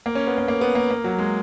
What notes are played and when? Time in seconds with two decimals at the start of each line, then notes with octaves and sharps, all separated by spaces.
0.06 A#3
0.15 C#4
0.27 B3
0.38 A#3
0.48 A#3
0.61 B3
0.75 A#3
0.90 A#3
1.04 F#3
1.19 G#3